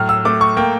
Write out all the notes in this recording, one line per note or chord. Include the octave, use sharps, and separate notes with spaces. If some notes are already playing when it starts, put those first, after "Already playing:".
Already playing: A2 F#3 F6
E6
A3 D6
C#6
A#3 G5